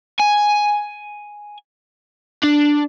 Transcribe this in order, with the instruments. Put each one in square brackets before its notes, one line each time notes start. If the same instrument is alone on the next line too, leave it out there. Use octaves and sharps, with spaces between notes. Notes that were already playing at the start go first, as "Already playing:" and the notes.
[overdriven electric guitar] G#5
D4